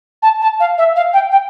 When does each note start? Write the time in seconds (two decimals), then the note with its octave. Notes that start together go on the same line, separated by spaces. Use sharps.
0.22 A5
0.41 A5
0.59 F5
0.77 E5
0.95 F5
1.13 G5
1.31 G5